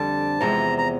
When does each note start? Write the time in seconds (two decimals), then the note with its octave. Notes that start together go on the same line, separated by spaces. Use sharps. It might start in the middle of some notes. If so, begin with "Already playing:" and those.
Already playing: F2 D3 G3 A5
0.41 E2 C3 F3 G#3 A#5
0.78 A#5